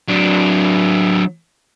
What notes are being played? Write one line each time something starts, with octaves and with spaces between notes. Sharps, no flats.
F#3 D4